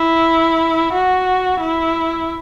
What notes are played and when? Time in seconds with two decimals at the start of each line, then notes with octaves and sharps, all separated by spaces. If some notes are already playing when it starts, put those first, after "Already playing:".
Already playing: E4
0.93 F#4
1.60 E4